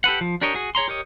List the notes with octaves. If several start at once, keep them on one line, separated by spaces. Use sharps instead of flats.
G4 A4 B4 F#5
F3
D4 G4 A#4 C#5 D#5
F#4 G#4
G#4 C#5 A#5 C6
G4 A#4 C#5 D#5